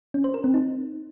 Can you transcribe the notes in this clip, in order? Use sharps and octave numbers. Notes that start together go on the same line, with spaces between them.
C#4
C5
A#4
C4
D#4